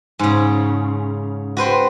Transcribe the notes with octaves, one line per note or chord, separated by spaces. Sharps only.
G#2 C#3
F#4 B4 C5 G5